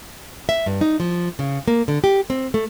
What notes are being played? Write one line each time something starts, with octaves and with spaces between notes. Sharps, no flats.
E5
G2
D#4
F3
C#3
A#3
D3
G4
C4
A3